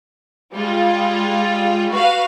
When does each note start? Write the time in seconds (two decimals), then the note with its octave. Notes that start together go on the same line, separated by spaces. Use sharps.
0.53 G3 G#3 F4
1.91 F#4 B4 F5